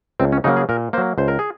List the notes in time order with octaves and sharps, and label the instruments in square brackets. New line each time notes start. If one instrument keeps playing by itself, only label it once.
[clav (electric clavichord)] C#2 C4
C#4
C#3 F#3 A#3 D#4
G#4
A#2 A#4
A#3 C5
F#3
C#2 C5
A#4
G#4